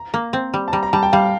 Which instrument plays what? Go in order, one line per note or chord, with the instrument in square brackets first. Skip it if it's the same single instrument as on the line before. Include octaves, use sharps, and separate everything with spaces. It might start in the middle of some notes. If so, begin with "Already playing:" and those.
Already playing: [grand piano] A#5
[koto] A#3
C4
G3
[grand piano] A5
[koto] G3 [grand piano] A#5
[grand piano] A#5
[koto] G3 [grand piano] A5
[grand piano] G5
[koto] G3 [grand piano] F5